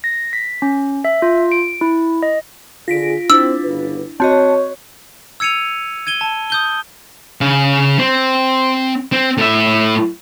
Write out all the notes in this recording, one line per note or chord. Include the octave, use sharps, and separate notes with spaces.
A#6
B6
C#4
E5
F4
D7
E4
D#5
D3 F4 G#4 A#6 B6 D7
C4 D4 E4 E6
G1 C#3 B4
C4 F#4 C#5 D#5 A5
E6 G#6 C#7 D#7 F7
G#6 D#7 G7
A5
D#6 G6 G7
C#3 F5
C4
C4
A2 E5